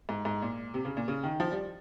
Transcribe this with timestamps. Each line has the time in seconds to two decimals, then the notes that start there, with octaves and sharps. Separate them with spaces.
0.09 G#2
0.25 G#2
0.42 A#2
0.74 C3
0.85 C#3
0.97 A#2
1.08 C#3
1.23 D#3
1.40 F3
1.52 G3